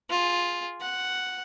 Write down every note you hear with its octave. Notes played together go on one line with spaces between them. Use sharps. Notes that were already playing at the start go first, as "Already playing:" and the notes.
F4 G#4
F#5